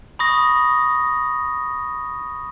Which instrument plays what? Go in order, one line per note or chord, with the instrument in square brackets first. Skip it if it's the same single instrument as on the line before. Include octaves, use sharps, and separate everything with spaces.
[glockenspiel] B5 C#6 D#6 A#6